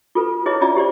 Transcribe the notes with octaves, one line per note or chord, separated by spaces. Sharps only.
F4 A4 B4
E4 G#4 B4 C#5 D#5
C#4 F4 D5 E5 A#5
G4 C5 D5